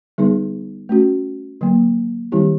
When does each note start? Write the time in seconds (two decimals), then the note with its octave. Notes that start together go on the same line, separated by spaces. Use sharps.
0.18 D3 G3 B3 D#4 G#4
0.89 A3 C#4 F#4
1.61 D3 F#3 A#3
2.32 D#3 G3 C4 E4 G4